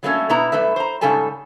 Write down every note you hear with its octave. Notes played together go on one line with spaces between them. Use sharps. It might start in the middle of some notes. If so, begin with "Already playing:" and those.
F#3 G3 A3 A#3 C#4 A4
B2 B3 E4 A#5
F#2 G3 A3 B4 E5
C5 A#5
G#2 C#3 G3 A4 G#5 A5